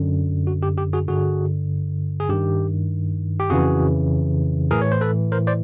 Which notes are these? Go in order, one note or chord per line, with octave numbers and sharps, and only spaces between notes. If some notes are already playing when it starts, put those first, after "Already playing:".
Already playing: F#2 D3
F#4
G4
G4
F#4 G#4
G2 D3 F#4 G#4
G#4
G2 D#3 G4
G4
F2 C#3 E3 F#4 G#4
A2 E3 G#4 A#4
C#5
C5
A4 B4
A#4 C5
C5 D5